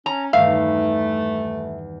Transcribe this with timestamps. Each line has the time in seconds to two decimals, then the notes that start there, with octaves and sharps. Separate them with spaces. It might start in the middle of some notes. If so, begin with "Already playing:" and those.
0.06 C#4 A#5
0.33 E2 G2 D#3 A3 E5 F5